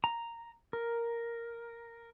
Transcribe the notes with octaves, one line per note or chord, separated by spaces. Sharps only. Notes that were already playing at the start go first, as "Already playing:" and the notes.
A#5
A#4